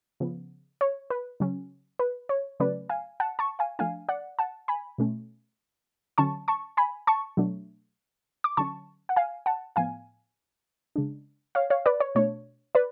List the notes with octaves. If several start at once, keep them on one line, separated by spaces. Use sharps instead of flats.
C#3 F3 B3
C#5
B4
C#3 F#3 C#4
B4
C#5
C#3 F#3 A3 C#4 B4 D5
F5 G#5
F#5 A5
A5 C#6
F5 G#5
F3 A3 D4 F5 G#5
D5 F#5
F#5 A5
G#5 B5
B2 A3 C#4
D3 F#3 C#4 A5 C#6
A5 C#6
G#5 B5
A5 C#6
B2 F#3 A3 D4
D6
D3 F#3 C#4 A5 C#6
F#5
F5 G#5
F#5 A5
A2 F3 B3 F5 G#5
C#3 G#3 D4
C#5 F5
C#5 F5
B4 D5
C#5
B2 A3 D4 C#5
B4 D5